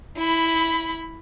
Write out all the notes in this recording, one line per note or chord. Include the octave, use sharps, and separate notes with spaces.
E4 B5